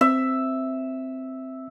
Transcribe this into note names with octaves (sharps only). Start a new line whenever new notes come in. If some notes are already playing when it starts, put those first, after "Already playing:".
C4 E5